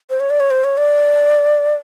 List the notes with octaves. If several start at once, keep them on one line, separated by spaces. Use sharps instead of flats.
C5
C#5
D5
C#5
C5
C#5
D5